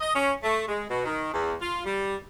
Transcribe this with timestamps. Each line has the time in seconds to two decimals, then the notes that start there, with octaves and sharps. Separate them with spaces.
0.01 D#5
0.16 C#4
0.44 A3
0.68 G#3
0.90 B2
1.06 D#3
1.33 E2
1.62 F4
1.85 G3